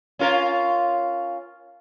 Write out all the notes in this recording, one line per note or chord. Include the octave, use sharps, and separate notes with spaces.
C#4 F4 A#4